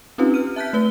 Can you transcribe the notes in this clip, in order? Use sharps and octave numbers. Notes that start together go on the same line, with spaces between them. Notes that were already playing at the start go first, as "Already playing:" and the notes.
C4 C#4 D#4 F4 G4 B4
F6 D#7
E5 A5 F#6 G6 B6
A3 B4 G7